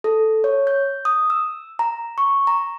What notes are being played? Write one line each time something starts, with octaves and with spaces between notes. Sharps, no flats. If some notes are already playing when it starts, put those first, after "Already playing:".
A4
C#5
G6
D#6
E6
A#5
C#6
A#5